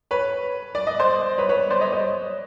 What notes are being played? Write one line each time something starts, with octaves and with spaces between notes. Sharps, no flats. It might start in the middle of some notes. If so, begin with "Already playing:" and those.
B4 C#5
D5
D#5
C5 D5
B4 C#5
B4 C#5
C5 D5
C#5 D#5
C#5 D#5